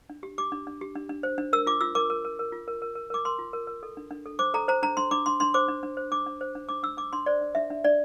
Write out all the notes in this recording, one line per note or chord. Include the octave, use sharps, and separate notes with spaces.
D4
G4
G4 D6
D4
D4
G4
D4
D4
C5
D4
A#4 E6
F4 D6
F4 E6
A#4 D6
A#4
A#4
A#4
F4
A#4
A#4
A#4
A#4 D6
A#4 C6
F4
A#4
A#4
A4
D4
D4
A4
C5 D6
A4 A#5
C5 A#5
D4 A#5
D4 C6
D4 D6
D4 C6
D4 C6
C5 D6
D4
D4
C5
D4 D6
D4
C5
D4
D4 D6
D4 E6
D4 D6
D4 C6
C5 D5
D4
D4 E5
D4
D4 D5